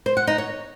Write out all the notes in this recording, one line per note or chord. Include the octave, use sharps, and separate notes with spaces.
C5
F#5
D#4
C#5